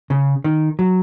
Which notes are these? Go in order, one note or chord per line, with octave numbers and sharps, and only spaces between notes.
C#3
D#3
F#3